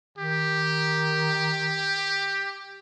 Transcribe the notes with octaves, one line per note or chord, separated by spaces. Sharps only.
D#3 G4